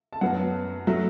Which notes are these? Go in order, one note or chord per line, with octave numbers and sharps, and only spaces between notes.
A5
F#2 F#3 B3 F#5
F#3 A3